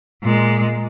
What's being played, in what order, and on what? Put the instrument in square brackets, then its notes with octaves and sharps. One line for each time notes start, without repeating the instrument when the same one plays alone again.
[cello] A#2 G#3